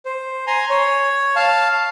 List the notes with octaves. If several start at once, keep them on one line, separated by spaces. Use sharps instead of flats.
C5
G#5 A#5 C6
C#5
F5 A5